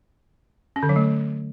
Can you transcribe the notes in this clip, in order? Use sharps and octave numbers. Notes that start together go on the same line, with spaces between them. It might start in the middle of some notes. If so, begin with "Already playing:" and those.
C#4
D3
F#3
A3